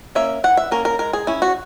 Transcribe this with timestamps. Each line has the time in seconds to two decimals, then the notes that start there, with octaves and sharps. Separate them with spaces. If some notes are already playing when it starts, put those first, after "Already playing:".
0.15 A#3 C#4 E5
0.44 E3 F#5
0.57 E5
0.71 A#3 C#4 A#4
0.85 A#4
0.99 G#3 A#4
1.13 G#4
1.27 C#4 E4
1.42 F#4